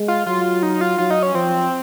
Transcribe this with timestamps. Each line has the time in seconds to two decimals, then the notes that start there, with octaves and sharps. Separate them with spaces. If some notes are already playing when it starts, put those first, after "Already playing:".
Already playing: G#3
0.08 F4
0.26 F#3 F4
0.63 D#4
0.81 F4
0.98 F#3 F4
1.11 D#4
1.23 C#4
1.34 F3 C4